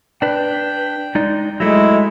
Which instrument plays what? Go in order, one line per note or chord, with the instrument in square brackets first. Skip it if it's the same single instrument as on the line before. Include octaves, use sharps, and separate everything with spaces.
[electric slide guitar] D4 B4 [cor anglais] G5
[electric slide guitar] G#3 D#4 D5
[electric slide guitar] F#3 A3 [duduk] G#3 [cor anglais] E4